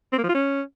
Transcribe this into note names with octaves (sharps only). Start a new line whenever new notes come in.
C4
A#3
F3
F4
C#4